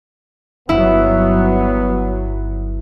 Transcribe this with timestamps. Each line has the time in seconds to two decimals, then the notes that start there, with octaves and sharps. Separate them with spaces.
0.69 G1 G2 F#3 B3 E4